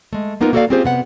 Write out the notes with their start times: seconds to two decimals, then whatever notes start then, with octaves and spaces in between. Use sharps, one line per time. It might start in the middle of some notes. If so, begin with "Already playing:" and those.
0.13 G#3 A3
0.41 A#3 B3 D#4 F4 A#4
0.53 A#3 F#4 A4 B4 D5 F5
0.70 C4 C#4 F4 G4 G#4 C5
0.84 C3 B3 F#5